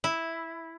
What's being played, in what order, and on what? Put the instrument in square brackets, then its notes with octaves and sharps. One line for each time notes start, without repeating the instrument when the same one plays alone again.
[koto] E4